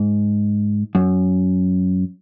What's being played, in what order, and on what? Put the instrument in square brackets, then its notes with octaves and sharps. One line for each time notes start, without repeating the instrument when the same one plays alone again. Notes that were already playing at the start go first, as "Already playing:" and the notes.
Already playing: [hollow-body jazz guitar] G#2
F#2